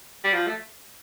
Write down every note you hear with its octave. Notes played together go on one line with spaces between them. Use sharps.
G3
F3
A3